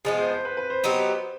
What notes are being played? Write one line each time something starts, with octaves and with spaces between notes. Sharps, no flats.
F3 G#3 B3 G#4
C5
C5
B4
B4
C5
F#3 B3 D#4 G4 C5